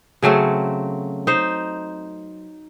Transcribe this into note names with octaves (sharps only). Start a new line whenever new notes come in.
C#3 F#3 A3 C4
D#4 C5